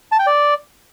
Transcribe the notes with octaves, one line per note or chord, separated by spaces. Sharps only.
A5
G5
D5